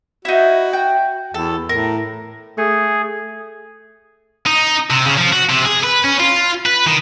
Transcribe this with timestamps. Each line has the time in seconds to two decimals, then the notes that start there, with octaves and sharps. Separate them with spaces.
0.25 D#4 E4 F#4
0.73 G5
1.34 E2 A4
1.69 A2 A#4
2.58 A3 G#4
4.46 D#4
4.90 C3
5.06 C#3
5.18 F3
5.33 F#4
5.50 C3
5.66 G#4
5.84 B4
6.04 C#4
6.20 F4
6.66 B4
6.86 D#3